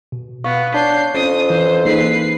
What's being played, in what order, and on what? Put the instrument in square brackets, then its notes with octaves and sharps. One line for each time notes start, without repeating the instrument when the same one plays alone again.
[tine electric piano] B2
[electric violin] B3 [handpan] F5 [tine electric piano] C#6 F#6
[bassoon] D4 [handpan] C#5 [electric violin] G6 C7
[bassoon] F2 [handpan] C#4 [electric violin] D#6
[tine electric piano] E3 [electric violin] C5
[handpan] A#3 D#4 G#4 [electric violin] B4 C7